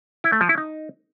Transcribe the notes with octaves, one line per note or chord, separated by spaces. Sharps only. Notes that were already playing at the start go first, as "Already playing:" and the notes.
E4
A3
F3
E4
D#4